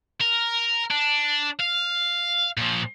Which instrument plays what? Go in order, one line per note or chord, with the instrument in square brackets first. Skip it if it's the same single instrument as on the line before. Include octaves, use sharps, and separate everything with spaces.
[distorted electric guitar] A#4
D4
F5
A#2 F3